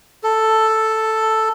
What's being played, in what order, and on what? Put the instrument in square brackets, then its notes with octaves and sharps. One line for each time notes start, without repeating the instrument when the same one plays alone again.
[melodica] A4